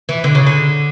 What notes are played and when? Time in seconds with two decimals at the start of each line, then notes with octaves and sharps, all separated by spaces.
0.09 E3
0.24 D3
0.35 C#3
0.46 D3